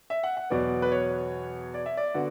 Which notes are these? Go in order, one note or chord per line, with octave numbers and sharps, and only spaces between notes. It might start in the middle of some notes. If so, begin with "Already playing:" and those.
E5
F#5
F#5
E2 B2 F#3 B3 D5
B4
C#5
D5
E5
D5
D3 B3 F#4